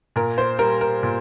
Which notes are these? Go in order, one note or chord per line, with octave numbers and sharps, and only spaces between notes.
A#2 A#4
C5
G3 A#4
A#4
A#2